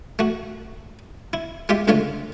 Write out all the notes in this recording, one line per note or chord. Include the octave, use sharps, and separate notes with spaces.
A3 F#4
E4
G#3 F4 G4 E5
C#2 D3 A3 F4 C#5